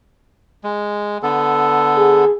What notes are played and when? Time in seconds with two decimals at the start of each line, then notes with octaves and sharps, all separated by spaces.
0.64 G#3
1.23 D3 B3 A4
1.97 G#4